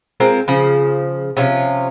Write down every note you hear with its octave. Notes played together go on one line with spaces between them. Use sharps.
G#3 C4 F4 A#4
C#3 F3
C3 F3 C#4 F4